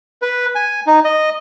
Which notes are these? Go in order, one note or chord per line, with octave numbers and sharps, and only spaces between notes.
B4
G#5
D#4
D#5